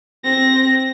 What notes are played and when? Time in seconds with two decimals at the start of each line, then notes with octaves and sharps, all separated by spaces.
0.24 C4 A#6